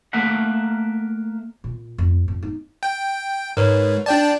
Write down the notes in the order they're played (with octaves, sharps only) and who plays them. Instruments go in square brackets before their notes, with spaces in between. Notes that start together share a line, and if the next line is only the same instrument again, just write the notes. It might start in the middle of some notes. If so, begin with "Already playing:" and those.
[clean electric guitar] A3 A#3 A#4 E5 F#5
[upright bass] A#2
F2
F2
D#4
[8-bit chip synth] G5
[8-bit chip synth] G#2 [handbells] A#4 B4 C#5
[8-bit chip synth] D4 G5 A5 [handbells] D5